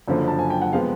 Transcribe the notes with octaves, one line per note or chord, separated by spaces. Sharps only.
F#1 F#2 D3 F3
A5
G#5
G5
F#5
C3 F3 G#3 B3 F5